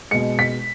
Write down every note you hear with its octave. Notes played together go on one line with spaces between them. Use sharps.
B2 G#3 C#7
B6